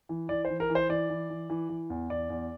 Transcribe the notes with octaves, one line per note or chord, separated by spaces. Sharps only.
E3
E3 D5
C5
E3
A#4
E3
C5
E3 D5
E3
E3
E3
E3
E2
E2 D5
E2